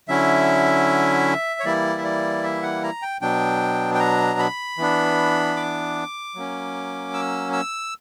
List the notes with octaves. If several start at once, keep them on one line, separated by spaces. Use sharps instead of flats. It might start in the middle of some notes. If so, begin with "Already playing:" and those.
D3 F#3 C#4 E4 E5
C#5
E3 G3 A#3 E4 D5
E5
D5
E5
F#5
A#5
G5
B2 F#3 B3 D4 G5
G5
A#5
B5
E3 B3 D4
D6
F#3 A#3 C#4
E6
E6